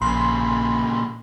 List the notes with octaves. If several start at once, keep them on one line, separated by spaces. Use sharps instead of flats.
A#1 A#2 C#3 B5 C6